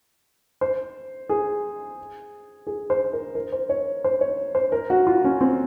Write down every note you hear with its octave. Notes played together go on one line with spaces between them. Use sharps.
C5
G#4
G#4
C5
A#4
A#4
C5
C#5
C5
C#5
C5
A#4
F#4
F4
C#4
C4